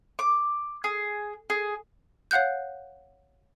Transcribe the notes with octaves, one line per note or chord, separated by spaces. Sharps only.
D6
G#4
G#4
C#5 F5 F#5 F#6 G6